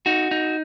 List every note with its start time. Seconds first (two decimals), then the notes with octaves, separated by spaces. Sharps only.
0.06 D#4 F#4
0.31 D#4